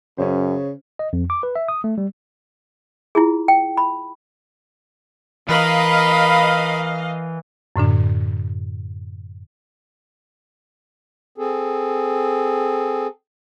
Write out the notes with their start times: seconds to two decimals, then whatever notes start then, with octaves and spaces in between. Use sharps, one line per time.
0.18 F#2 C#3 C#4 C5
0.99 D#5
1.13 F2
1.30 D6
1.43 B4
1.56 E5
1.68 D#6
1.84 A3
1.98 G3
3.15 E4 F4 G#4
3.48 G5
3.77 B5
5.49 E3 A#4 B4 D#5 F5 B5
7.76 F#2 A2 D3 D4
11.38 C4 G#4 A4